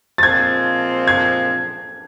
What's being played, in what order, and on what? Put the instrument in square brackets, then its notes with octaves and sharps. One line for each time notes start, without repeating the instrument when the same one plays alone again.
[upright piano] A6
[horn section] A#2 F3 G#3 C4 [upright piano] G#6
[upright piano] G#6